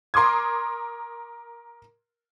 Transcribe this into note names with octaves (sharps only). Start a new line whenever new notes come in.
A#4 C6 D6 D#6 G#6